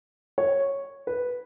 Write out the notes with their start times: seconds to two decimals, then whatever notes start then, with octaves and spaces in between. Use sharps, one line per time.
0.38 C#5
1.07 B4